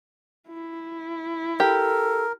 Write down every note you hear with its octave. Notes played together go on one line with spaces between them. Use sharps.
E4
G4 A4 A#4